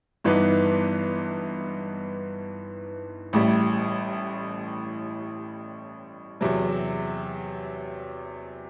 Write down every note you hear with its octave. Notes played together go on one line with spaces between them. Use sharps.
G1 G2 E3 B3 D#4
A1 A2 G3
E2 C3 F#3